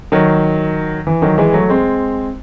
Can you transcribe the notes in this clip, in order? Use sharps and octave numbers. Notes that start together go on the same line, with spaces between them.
D#3 F#3
E3
D#3 F#3
E3 G#3
F#3 A3
G#3 C4